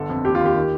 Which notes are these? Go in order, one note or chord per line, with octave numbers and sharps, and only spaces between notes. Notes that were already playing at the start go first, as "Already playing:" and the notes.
Already playing: G1 D3 A4
F2
D#2 G4
F4
D#2
G4
D#3